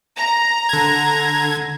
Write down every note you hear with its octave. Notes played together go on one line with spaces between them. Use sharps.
A#5
D3 G#6